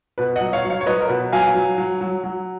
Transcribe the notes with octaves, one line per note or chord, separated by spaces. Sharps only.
B2 B4
D#5 F#5
F#3
C#5 F5
F#3
C#5 F5
C#5
F#3 B4 D#5
A#4
B2 B4
F#3 F5 G#5
F#3
F#3
F#3
F#3